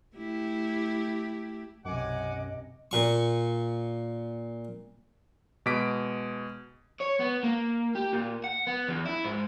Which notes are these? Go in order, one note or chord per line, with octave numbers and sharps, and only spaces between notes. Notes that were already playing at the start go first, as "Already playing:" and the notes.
A3 E4 G4
B1 F#2 C3 D#5 F#5 G#5 D6
A#2 C#6
B2 G#3 D#5 D6 B6 D7
C#5
B3
A#3
G4
A#2
F#5
B3
E2
E4
G#2